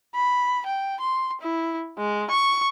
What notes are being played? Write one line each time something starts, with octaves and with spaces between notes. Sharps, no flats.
B5
G5
C6
E4
G#3
C#6